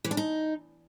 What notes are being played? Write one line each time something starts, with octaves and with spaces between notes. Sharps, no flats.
E3
D4
D#4